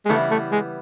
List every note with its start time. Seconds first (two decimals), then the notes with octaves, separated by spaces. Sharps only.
0.05 G#3
0.09 C#3 E3 G3 A3 B3 E4
0.31 A3
0.52 G#3